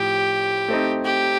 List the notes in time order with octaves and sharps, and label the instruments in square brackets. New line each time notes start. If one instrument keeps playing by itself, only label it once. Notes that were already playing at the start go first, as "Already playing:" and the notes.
Already playing: [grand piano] A2 F3 [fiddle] G4
[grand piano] A3 C4 D#4
[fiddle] G4